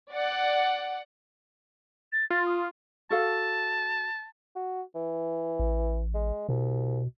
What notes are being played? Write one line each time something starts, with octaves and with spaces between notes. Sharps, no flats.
D5 F#5
A6
F4 A6
D#6
F#4 A4 F5 A5
F#4
E3
A1
G#3
C2 B2